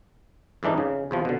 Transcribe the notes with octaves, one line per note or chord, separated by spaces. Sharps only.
F2 G#2 E3 D4 D#4
C#3
E2 C3 F3
B2 D3